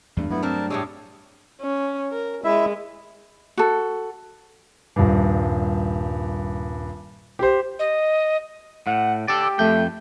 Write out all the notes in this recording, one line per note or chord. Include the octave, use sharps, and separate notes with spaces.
E2 G2 A3
F#3 A3 B3 E4
C4 D4 A#4 A5
A2 G3 G#4 C#5 D6 E6
C#4
A#4
G#3 E4 E5
F#4 A4
D#1 G2
G4 C5
D#5
A2 F#5
G4 A4 D5
F2 A3 G5